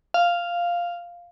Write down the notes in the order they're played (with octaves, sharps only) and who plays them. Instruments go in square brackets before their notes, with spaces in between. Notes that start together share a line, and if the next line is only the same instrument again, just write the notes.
[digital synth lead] F5